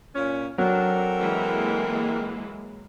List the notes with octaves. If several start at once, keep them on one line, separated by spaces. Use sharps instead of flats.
A#2 C#4
F#3 C4 D4 A4 A#4
E3 G#3 A#3